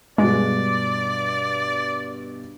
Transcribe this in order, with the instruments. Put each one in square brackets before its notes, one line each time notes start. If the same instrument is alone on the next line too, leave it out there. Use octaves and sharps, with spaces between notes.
[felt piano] G2 B2 F#4 [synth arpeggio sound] G#3 [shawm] D5